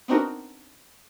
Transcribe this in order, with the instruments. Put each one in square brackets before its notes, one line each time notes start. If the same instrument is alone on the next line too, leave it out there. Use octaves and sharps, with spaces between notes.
[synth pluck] B3 C4 D4 D#4 F#4 A#4